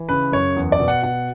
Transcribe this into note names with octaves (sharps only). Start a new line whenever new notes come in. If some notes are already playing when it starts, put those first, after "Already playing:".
Already playing: E3
C#3 B4
F#2 C#5
E2
D5
B2
F#5
B2 F#5